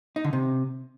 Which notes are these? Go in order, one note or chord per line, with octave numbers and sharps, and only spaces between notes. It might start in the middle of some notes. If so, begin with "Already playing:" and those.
D#4
D3
C3